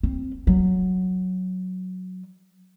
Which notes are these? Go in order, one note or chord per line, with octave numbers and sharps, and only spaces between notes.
C4
F#3